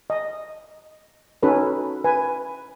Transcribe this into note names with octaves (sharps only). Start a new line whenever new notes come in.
D#5
C#4 D#4 F#4 A4 B4
B4 G#5